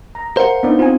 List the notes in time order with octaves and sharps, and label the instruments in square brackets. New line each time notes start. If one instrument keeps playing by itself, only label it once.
[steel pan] A#5
[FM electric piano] A#4 [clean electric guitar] C5 F5 F#5
[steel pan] B3 D4 D#4
[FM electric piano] C4 [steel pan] F4 G#5